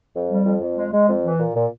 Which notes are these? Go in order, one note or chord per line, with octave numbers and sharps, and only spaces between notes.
F2
G3
F2
F2
G#3
G#3
F2
E3
A#2
A#2